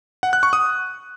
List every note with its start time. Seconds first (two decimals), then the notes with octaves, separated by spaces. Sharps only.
0.23 F#5
0.33 F#6
0.43 C#6
0.53 D#6